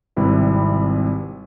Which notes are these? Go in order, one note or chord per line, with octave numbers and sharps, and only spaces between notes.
G#1 C3 G3 E4 B4